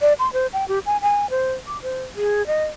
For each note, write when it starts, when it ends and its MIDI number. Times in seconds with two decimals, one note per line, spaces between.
0.01 0.13 74
0.19 0.31 84
0.33 0.47 72
0.53 0.67 79
0.68 0.79 67
0.86 1.01 80
1.02 1.30 80
1.30 1.53 72
1.67 1.81 86
1.82 2.04 72
2.16 2.46 68
2.47 2.65 75